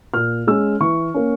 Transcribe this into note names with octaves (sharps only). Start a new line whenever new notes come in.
A#2 F6
G#3 C#4 E6
E3 C#6
A#3 C#4